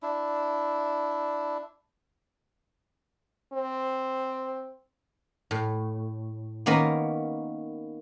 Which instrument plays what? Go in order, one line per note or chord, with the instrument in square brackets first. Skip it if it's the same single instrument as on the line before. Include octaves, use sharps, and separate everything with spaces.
[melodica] D4 E4
[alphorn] C4
[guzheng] A2
D#3 A#3 B3 C#4 A#4